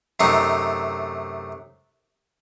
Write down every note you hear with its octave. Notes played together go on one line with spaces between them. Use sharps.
F#2 C3 A3 D#4